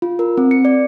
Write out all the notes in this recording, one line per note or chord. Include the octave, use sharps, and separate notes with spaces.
F4
A#4
C4
C#7
D5